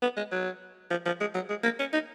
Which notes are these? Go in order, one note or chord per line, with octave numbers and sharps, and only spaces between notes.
B3
G#3
F#3
F3
F3
G#3
F#3
G#3
A#3
C#4
D#4